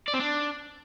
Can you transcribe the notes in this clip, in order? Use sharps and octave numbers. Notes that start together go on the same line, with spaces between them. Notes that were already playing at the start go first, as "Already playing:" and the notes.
D5
C4
D4